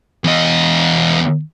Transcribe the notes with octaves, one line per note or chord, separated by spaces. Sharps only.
E2 D#5